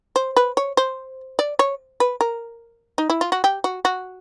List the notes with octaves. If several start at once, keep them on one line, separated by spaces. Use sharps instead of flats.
C5
B4
C#5
C5
D5
C#5
B4
A#4
D#4
E4
F4
F#4
G4
F#4
F#4